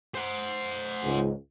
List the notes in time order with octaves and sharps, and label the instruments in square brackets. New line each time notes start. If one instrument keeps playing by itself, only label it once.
[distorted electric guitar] C5 F#5
[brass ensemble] C#2 G#2